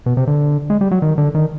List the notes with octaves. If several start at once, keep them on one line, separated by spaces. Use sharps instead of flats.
B2
C3
D3
G#3
G3
F#3
D#3
D3
D#3